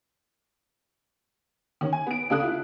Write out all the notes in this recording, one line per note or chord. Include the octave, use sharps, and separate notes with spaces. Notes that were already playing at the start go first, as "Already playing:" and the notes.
D#3 C#4
G#5
B3 D7
C#2 C#3 D4 A4 D#6 F#6
E4 F4